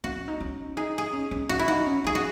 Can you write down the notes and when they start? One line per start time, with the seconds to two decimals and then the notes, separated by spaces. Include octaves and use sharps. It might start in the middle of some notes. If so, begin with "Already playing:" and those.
0.04 C#4 F#4
0.16 C#4
0.28 D#4
0.40 C#4
0.77 D#4 G#4
0.98 G#4
1.13 C#4
1.31 C#4
1.49 C#4 F#4
1.59 E4
1.68 D#4 F#4
1.86 C#4
2.04 C#4 G#4
2.15 F#4